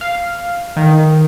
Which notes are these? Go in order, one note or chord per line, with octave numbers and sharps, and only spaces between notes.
F5
D#3